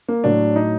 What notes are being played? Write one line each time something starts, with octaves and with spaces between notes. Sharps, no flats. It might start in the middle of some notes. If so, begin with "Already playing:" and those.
A#3
A2 F#3 D4
D#4